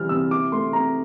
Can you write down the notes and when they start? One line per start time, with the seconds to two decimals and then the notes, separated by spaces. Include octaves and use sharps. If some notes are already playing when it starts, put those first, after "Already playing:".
Already playing: E3 G3 C4 F6
0.09 C3 E6
0.31 E4 D6
0.52 A3 C6
0.73 C4 A#5